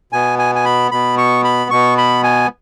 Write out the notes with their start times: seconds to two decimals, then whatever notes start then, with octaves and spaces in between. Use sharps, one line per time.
0.12 B2 B3 G#5
0.39 G#5
0.55 G#5
0.65 B5
0.91 B2 B3 B5
1.18 C#6
1.44 B5
1.71 B2 B3 C#6
1.98 B5
2.23 G#5